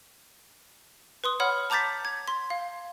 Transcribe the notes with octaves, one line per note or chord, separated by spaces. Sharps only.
B4 C6 D#6
C#5 F#5 B5 F6
A5 A#5 D6 G6 A6 B6
G#6
C6
F5